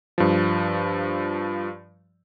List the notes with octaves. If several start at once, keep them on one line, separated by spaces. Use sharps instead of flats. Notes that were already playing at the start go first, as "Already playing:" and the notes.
G2 F3